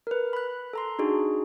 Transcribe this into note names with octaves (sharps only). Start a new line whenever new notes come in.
A#4 B4
B5 F#6
A4 A#5 C6
D4 D#4 F#4 G#4